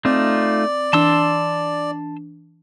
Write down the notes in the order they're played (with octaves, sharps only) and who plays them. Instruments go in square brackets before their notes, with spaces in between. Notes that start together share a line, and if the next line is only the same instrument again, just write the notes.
[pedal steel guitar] A3 D#4 F4 [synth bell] C4 [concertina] D5
[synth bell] E3 D4 [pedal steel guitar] A5 C6 E6